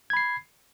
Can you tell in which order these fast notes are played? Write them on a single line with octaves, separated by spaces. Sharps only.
G#6 B5 C7